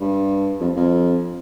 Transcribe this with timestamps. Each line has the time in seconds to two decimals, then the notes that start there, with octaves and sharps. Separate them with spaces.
0.01 G2
0.60 F2
0.76 F2